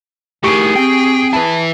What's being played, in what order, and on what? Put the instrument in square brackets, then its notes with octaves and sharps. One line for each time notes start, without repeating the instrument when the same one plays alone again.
[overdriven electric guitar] A2 D#3 [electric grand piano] G4 C#6 D7 [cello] G#4
[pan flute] C4 [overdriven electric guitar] G5
[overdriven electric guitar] E4 B4 [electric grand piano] A5